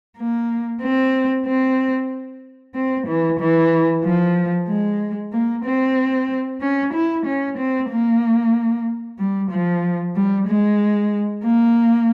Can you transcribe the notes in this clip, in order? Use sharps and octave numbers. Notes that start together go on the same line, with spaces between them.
A#3
C4
C4
C4
E3
E3
F3
G#3
A#3
C4
C#4
E4
C#4
C4
A#3
G3
F3
G3
G#3
A#3